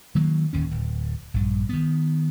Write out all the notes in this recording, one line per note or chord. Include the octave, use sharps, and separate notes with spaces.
D#3 F#3 A#3
D1 D#2 C#4
D1
A#1 G2
D#3 B3